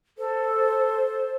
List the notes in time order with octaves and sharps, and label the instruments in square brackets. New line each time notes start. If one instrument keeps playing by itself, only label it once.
[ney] A4 [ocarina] C5